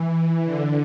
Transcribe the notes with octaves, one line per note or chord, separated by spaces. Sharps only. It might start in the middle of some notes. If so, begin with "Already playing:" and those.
Already playing: E3
D3